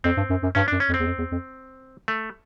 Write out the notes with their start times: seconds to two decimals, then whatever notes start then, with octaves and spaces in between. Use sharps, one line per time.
0.04 F2 C4
0.17 G2
0.30 F#2
0.43 F#2
0.55 G2 C#4
0.68 F#2 D4
0.80 C#4
0.89 F2
0.94 C4
0.99 E2
1.06 F2
1.18 E2
1.31 F2
2.08 A3